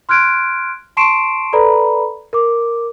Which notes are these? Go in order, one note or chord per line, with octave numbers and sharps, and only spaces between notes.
C6 F6 F#6 G#6 D7
A5 C6 C#6 C7 D7 E7
A4 B4 D5 A#5 B5
A#4 D6